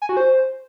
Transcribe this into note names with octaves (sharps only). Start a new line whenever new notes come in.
G#5
F#4
C5